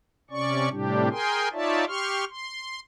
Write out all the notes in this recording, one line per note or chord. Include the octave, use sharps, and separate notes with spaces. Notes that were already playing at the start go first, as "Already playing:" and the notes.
C3 C#4 D5 C#6
A2 C3 G3 D4 G4
G#4 A#4 G5 G#5 C6
D#4 F4 C#5 D5 E5 A5
G4 C6 C#6 F6
C6